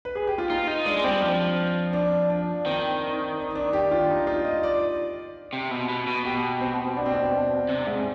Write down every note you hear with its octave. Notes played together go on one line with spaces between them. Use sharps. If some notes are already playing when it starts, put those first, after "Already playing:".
B4
G#4
G4
F4
D#4 F4
D#4
G#3 D4
G#3
G3 C4
F3
D4
D4
D#3 C4
D4
D4
G4
F4
D#4
F4
D#5
D5
C3
B2
B2
B2
B2 G4
C4
D4
C4
D4
C3
G#2